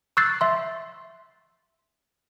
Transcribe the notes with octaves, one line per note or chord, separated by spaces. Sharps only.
C#6 E6 F#6 G6 A6 C7
E5 C6